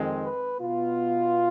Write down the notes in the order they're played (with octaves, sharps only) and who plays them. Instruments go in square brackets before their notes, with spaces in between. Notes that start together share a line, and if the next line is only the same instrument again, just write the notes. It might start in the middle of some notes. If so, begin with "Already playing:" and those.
Already playing: [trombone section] F2 D#3 G#3 C4
B4
B2 B3 F4